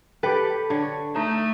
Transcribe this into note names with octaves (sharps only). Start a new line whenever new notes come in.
G4 A4 B4 G5
D3 C#5
A3 D#4